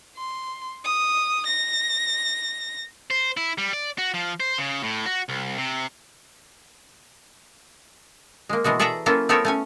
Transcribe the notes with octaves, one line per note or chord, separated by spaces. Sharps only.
C6
D#6
A#6
C5
E4
G3
D5
F#4
F3
C5
C#3
A2
F#4
C2
C3
G#3 A#3
B2 E3 G#3 F#4
G#4 A4 D5 E5 F#5 A#5
F#3 A#3 C#4 E4 F4 A4
A3 B3 C4 A#4 C#5 E5
A3 C#4 G#5